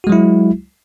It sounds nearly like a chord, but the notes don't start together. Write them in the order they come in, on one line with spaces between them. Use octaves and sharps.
F#4 G#3 F#3 E4